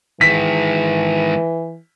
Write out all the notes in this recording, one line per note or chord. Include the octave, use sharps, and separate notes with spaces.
D#3 E3 G#3 B6